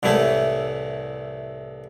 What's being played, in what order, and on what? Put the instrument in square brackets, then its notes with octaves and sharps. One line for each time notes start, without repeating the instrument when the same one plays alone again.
[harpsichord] C2 A2 E3 A3 E4